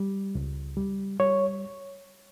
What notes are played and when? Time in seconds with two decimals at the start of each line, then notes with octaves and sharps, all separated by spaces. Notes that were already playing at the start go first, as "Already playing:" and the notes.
Already playing: G3
0.35 C#2
0.77 G3
1.20 G3 C#5